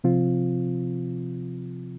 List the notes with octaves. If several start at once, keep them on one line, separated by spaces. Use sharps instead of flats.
C3 F3 C4 F4